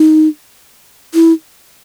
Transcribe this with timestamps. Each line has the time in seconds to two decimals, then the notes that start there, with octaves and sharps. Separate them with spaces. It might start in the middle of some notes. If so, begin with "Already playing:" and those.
Already playing: D#4
1.14 E4